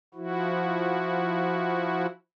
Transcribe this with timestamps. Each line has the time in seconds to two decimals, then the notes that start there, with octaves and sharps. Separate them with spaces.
0.14 F3 E4 F#4